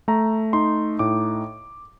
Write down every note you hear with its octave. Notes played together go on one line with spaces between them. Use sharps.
A3 A#5
D#4 C6
A2 D6